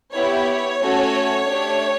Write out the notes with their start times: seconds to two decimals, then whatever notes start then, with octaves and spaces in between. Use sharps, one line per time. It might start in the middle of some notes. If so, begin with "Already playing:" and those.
0.14 B3 E4 G4 C#5
0.81 A3 C#4 F#4 A4
1.46 A3 D4 G4